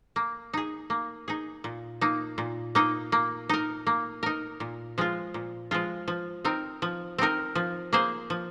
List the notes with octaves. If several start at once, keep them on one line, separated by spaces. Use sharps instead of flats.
A#3
D#4 G#4
A#3
D#4 G#4
A#2
A#3 D#4
A#2
A#3 D#4
A#3
D#4 A#4
A#3
D#4 A#4
A#2
F3 G#3 F4
A#2
F3 G#3 F4
F3
C4 D#4 A#4
F3
C4 D#4 A#4
F3
A#3 G#4 C5
F3